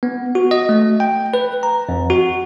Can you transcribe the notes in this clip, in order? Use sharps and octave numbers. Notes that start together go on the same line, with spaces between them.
B3
F#4
D#5
A3
G5
B4
A#5
F2
F#4